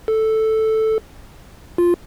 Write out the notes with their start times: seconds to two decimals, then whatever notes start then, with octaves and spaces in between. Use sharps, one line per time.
0.08 A4
1.78 F4